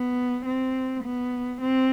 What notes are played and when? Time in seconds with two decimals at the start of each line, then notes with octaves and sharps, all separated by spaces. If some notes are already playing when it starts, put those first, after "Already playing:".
Already playing: B3
0.46 C4
1.04 B3
1.61 C4